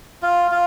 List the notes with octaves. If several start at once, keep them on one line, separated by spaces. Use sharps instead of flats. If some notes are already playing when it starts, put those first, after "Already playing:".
F4
F4